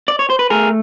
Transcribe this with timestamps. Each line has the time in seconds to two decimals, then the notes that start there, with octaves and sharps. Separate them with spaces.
0.08 D5
0.19 C#5
0.30 C5
0.39 B4
0.50 A3 G#4 A#4